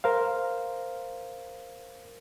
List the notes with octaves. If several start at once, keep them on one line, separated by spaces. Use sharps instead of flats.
A#4 C5 F5